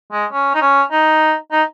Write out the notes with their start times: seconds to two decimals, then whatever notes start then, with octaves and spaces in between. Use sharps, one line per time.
0.11 G#3
0.32 C#4
0.55 D#4
0.61 C#4
0.92 D#4
1.52 D#4